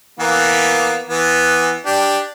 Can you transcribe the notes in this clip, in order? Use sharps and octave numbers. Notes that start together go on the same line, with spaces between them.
E3 A#3 B3
E3 B3
D4 G4